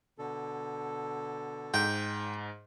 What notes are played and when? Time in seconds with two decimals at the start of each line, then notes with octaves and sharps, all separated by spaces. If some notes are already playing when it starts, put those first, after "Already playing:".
0.19 B2 D3 A4
1.74 G#2 G5